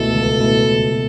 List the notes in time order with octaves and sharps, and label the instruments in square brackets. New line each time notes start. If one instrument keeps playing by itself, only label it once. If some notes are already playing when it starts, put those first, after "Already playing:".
Already playing: [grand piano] C#2 B2 A3 E4 [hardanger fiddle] A4
[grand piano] C#2
B2 A3 E4
C#2
B2